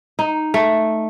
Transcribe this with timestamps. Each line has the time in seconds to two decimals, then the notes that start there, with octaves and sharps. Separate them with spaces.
0.19 D#4
0.54 A3